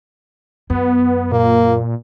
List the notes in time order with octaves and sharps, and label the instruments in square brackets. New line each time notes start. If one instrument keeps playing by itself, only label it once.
[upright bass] F#2 [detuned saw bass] B3
[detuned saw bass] A#2 [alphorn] A#3